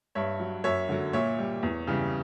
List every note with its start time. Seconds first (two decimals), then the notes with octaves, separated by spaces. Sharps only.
0.15 G2 C#5 E5
0.40 F#3
0.64 F#2 C#5 E5
0.89 D3 F#3
1.13 A#2 C#5 E5
1.39 G3
1.63 E2
1.87 C#3 E3 G3